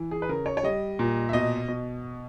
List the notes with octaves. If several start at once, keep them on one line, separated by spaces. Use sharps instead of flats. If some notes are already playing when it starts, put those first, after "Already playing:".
Already playing: E3
G#4
B4
C#3 A#4
C#5
C#5
G3 D#5
A#2
E5
B2 D#5
B2